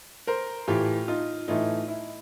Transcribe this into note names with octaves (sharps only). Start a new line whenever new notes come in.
A#4 C5
A2 E3 A3 F4 G4
D#4 F4
A2 E3 A3 D#4 F4
E4